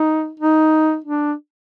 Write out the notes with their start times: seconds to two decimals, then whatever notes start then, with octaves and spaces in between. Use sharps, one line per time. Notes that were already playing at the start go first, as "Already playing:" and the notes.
Already playing: D#4
0.40 D#4
1.04 D4